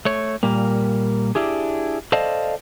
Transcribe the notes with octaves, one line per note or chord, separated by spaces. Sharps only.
A3 C#5
A#2 G3 A#3
D4 E4 G4 G#4
A4 C5 D5 D#5 F5 A5